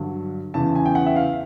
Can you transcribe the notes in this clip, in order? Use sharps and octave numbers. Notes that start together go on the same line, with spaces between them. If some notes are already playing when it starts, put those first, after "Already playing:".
Already playing: G2 D3 F#3
E2 C#3 E3 A5
G#5
G5
F#5
E5
F5